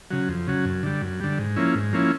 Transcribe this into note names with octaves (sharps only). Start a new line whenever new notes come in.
C#3 F#3
F2
C#3 F#3
F#2
D3 G3
F#2
D3 G3
G#2
F3 A#3 C#4 E4
G#2
F3 A#3 C#4 E4